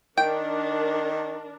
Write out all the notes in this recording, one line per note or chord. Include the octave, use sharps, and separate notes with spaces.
D#3 D4 A#4 G5